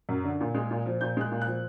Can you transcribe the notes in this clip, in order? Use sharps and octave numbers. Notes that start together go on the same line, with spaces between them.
F#2
D3
A#2
G#3
A#2
F3
A#2 G6
G#3 F#6
A#2
F#6
F3